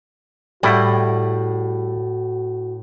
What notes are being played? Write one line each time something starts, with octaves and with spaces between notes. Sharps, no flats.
A2 G3 E4 F#4 F#5